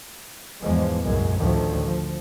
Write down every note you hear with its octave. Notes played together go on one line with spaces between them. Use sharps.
E2 G#2 F3 G#3
C2 F#2 A#2 G#3
A1 D2 A2 D#3 F3 A3
F3